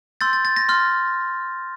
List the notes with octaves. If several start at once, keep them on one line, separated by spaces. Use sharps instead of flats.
C6 E6 G6 A6
A6
A6
A#6
C6 F6